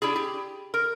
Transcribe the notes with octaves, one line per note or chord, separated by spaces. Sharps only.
D4 E4 G4 G#4
G4
A#4